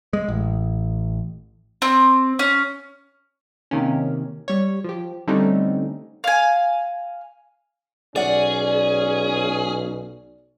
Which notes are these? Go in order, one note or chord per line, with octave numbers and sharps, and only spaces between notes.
G#3
A1
C4
C#4
C3 D#3 A#3 C#4
G3 C#5
F3 G4
D3 G3 A3 C4 C#4 D#4
F5 G#5
B1 C#4 G#4 D5 F#5